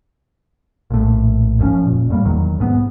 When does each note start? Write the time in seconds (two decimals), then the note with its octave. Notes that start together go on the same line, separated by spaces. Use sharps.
0.90 A#1 A2
1.59 F1 F#2 F3 C#4
1.87 A#2
2.10 F2 A2 G3 A#3
2.25 E2 D#3 F#3
2.59 C2 G#2 F3 B3